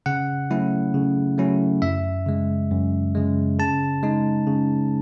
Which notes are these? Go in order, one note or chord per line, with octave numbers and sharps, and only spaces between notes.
C#3 F#5
F#3 A3 C#4 E4
C#3
F#3 A3 C#4 E4
F#2 E5
C#3 G#3
F#2
C#3 G#3
C#3 A5
G#3 D#4
C#3